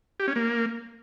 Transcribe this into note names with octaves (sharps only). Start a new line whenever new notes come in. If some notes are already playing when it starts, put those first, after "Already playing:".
G4
C#4
A#3